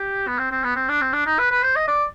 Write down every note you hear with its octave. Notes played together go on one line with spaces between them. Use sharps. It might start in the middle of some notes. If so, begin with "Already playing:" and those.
Already playing: G4
B3
C4
C4
B3
C4
D4
C4
D4
D#4
B4
B4
C5
D#5
D5